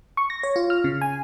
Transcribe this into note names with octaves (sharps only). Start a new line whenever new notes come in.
C#6
A#6
C#5
F4
F6
C#3
G#5